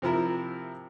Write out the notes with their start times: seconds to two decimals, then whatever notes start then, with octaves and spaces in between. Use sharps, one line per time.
0.02 C3 F3 E4 A#4